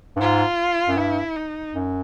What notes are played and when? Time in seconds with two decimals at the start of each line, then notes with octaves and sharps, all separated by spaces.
0.16 G2
0.20 G#2 F4
0.88 F#2
0.97 G2 E4
1.36 D#4
1.74 F#2